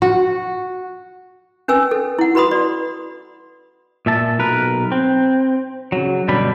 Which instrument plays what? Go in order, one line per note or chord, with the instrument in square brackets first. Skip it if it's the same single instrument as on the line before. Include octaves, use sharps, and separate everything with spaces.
[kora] F#4
[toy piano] C#4 B4 G#5 E6
A4
E4 F#5
F#4 B4 B5 C6 D#6
D5
[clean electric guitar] A#2 E5 A5
B1 A#4 B4
C4
C#3 F#3
G2 B2 D3 G3 B5